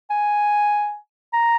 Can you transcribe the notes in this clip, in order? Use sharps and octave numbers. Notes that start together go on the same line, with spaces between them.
G#5
A#5